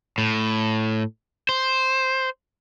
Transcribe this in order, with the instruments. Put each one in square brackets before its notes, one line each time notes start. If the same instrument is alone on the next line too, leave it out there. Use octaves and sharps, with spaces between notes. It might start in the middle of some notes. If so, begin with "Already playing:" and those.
[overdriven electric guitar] A2
C5